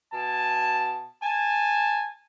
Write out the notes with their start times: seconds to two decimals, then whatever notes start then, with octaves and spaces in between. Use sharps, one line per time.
0.13 B2 G#5 A5
1.22 G#5 A5